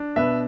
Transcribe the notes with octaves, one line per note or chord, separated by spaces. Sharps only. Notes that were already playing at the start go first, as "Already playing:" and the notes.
Already playing: D4
B2 B4 E5